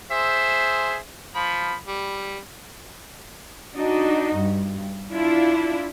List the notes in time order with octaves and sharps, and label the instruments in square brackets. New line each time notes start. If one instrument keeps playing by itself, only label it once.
[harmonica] G#4 C5 E5
F3 B5
G3
[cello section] D4 D#4 F#4
G2
D4 E4 F4